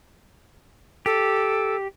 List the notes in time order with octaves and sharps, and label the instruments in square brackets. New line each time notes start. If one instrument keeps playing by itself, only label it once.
[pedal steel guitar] G4 [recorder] A4